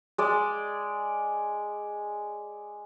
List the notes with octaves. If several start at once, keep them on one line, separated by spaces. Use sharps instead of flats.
G#3 D5